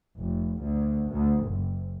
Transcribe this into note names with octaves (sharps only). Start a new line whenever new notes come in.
F1
D2
D2
F#1